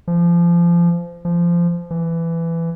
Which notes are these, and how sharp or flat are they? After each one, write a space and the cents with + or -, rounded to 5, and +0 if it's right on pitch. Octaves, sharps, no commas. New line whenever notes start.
F3 -25
F3 -20
E3 +15